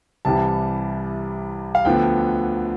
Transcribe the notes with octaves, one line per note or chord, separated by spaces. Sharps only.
C2 C3 E3 G3 A5
F5
D2 D3 F3 B3 G5